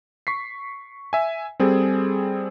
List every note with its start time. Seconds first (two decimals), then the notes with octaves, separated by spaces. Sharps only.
0.27 C#6 B6 C7
1.13 E5 G#5
1.60 G3 C4 G#4 A4